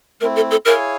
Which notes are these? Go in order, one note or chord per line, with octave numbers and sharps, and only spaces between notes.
A3 C4 E4 A#4
A4
A4
E4 G#4 A#4 C#5 F5 G#5